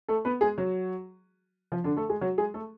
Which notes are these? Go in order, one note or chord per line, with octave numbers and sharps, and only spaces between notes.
A3 A4
B3 B4
G#3 G#4
F#3 F#4
F3 F4
D3 D4
A3 A4
G#3 G#4
F#3 F#4
G#3 G#4
A3 A4